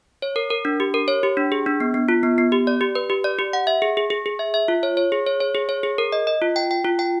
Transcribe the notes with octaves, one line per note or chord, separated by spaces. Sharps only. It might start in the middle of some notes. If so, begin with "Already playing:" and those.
C#5
A#4
A#4
D4
G4
A#4
C#5
G4
D4
G#4
D4
B3
B3
F4
B3
B3
G4
D5
G4
B4
G4
D5
G4
F#5
E5
G#4
G#4
G#4
G#4
E5
E5
F4
C#5
C#5
G#4
C#5
C#5
G#4
C#5
G#4
A#4
D#5
D#5
F4
G5
G5
F4
G5